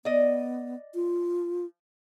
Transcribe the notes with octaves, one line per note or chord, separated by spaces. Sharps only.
B3 D5 D#5
F4